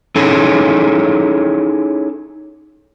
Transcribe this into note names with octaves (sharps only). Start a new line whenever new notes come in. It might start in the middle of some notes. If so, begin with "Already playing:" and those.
C#4 D#4 E4 G#4 A4 C#5